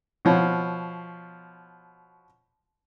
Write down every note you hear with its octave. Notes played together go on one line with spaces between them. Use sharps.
B2 F3 C#5